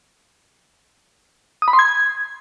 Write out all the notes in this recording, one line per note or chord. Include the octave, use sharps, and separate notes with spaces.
D#6
B5
C6
G#6